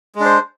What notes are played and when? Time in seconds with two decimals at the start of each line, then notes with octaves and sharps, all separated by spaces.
0.15 G#3
0.20 D4
0.25 C5